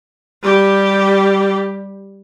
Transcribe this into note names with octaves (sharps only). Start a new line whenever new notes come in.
G3 G4